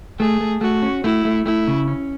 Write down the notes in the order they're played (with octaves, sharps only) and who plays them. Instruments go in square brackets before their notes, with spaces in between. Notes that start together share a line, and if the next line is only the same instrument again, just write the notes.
[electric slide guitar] A3 [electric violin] G#4
[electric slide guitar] A3
[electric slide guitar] A3 [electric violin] F#4
[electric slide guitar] C#4
[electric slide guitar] A3 [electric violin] E4
[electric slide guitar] A3
[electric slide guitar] A3 [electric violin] E4
[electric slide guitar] C#3
C#4